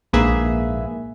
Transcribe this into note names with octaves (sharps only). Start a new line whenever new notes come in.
A#1 G#2 A#3 G#4 B4 E5